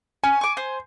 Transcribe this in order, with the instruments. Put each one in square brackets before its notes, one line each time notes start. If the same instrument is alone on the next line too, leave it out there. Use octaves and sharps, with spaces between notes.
[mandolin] C#4 [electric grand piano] G#5
[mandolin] C#6 D6
C5